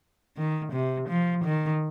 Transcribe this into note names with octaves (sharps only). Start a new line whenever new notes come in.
D#3
C3
F3
D#3